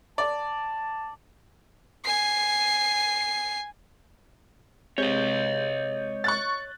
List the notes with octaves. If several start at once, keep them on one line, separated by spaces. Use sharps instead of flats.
D5 A5
G#5 C7
C3 G#3 C#5 D#5 G6
C#6 F#6 A6